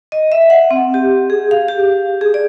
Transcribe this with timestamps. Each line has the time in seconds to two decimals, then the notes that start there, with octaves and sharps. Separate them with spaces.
0.12 D#5
0.32 E5
0.50 F#5
0.71 C4
0.94 G4
1.30 G#4
1.51 F5
1.68 G4
2.21 G#4
2.34 D5